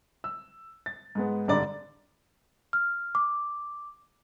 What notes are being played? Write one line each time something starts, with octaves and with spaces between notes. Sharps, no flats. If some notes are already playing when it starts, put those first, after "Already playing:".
E6
A6
G#2 G#3 B3
G#1 G2 D3 D5 A#5 D6
F6
D6